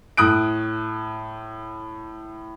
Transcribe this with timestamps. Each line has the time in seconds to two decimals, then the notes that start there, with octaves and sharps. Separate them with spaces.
0.17 A2 D#6 F#6 D7